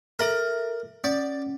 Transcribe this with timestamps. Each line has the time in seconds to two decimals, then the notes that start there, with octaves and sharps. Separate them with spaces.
0.19 A4 A#4 E5 A#5
1.04 C#4 D5